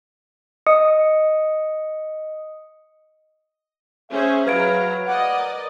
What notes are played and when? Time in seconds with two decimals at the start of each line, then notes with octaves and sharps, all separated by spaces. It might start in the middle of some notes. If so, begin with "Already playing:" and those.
0.67 D#5 D#6 C#7
4.11 C#4 G#4 C5 E5
4.47 F#3 B4 F5 A#5 G#6 D7
5.06 D5 D#5 F#5
5.38 A#4